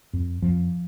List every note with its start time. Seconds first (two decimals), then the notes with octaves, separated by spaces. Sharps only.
0.13 F2
0.42 F2 F3